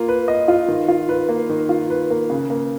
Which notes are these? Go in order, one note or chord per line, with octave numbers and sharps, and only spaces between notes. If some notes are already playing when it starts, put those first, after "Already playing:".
Already playing: A#3 F4
B4
D#5
F4
D#3
F4
B4
A#3
D#3
F4
B4
A#3
C#3
A#3